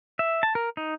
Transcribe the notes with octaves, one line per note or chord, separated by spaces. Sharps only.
E5
A5
A#4
D#4